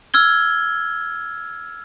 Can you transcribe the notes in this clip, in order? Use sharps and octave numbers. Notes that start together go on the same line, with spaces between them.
E6 F6 G#6 G7